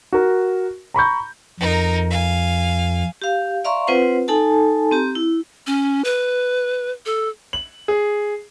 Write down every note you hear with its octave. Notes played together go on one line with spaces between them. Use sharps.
F#4 A#4
A#5 B5 C#6 G6
F2 D#4 A#4
F5 G#5
G4 F5
D5 E5 F5 A#5 C6 C#6
C4 F4 B4 C5 F#5
D#4 A4 G#5 A5
C4 G4 A#5
E4
C#4
B4
A4
F#7
G#4